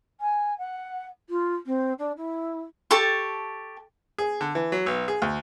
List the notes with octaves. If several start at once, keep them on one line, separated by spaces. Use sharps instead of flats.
G#5
F#5
F4
C4
D4
E4
G4 A4 A5 C#6
G#4
D3
E3
F#3
B1
G#4
D2